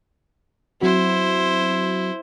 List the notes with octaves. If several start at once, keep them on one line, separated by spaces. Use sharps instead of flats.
F#3 C4 E4 F#4 C5